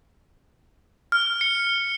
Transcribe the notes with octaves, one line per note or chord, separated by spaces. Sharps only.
F6
C#7